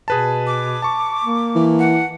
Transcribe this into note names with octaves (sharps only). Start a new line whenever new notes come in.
B2 G#4 B4 A5
D6
A5 C#6
A#3
E3
F#5